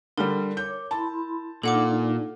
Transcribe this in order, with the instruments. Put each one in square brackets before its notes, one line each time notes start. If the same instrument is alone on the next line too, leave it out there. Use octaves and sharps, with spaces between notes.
[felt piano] D3 G3 [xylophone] A#4
[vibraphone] C#5 D6 [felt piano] G6
[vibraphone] E4 B5 C6 [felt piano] A5
[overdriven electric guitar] A#2 [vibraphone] D4 D#4 D5 [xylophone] A4 F#5 D6